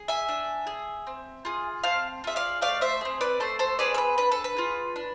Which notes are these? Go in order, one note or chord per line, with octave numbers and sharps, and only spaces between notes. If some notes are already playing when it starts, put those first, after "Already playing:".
Already playing: G#4
E5 G#5
D4
G#4
C4
F4 G#4
C4 F5 A5
F4 G#4 E5
D5 F5
A3 D5 F5
C5 E5
C4 G#4
B4 D5
A3 A4 C5
A4 C5
C4 G#4 B4 D5
A4
B4
D4 B4
A4
B4
F4 G#4
D4